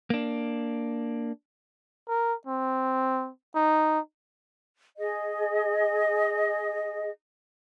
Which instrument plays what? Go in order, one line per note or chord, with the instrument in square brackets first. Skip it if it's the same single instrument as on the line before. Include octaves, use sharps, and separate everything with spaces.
[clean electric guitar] A#3 D4
[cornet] A#4
C4
D#4
[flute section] G#4 D#5